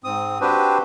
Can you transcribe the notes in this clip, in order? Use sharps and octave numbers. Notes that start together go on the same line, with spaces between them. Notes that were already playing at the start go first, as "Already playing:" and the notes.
G#2 C4 D#6
C4 D4 F#4 G4 B4 C5